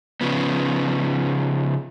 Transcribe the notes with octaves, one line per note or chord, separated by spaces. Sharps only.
C#3 F3 B3